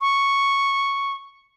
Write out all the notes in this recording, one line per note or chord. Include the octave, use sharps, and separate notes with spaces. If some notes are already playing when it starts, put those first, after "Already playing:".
C#6